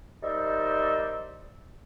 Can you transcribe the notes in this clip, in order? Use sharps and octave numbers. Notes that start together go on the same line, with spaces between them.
G3 D#4 A#4 C5 D5 E5